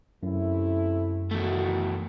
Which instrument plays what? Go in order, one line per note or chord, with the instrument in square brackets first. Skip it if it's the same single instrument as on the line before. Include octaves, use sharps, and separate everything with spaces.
[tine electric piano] F#2 [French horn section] C3 A3 E4
[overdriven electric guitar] E2 A3 [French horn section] D#3 E4 F#4